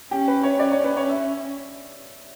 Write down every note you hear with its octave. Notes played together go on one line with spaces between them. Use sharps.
C#4 G4
B4
C#5
C#4 D5
C#5
B4
C#5
E5